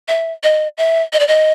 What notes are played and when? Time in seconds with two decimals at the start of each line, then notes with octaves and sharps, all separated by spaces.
0.08 E5
0.43 D#5
0.78 E5
1.13 D#5
1.20 D5
1.28 D#5